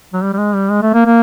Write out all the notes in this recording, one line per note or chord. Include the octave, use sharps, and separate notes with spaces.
F#3
G3
G3
G#3
G3
G#3
A3
A#3
A#3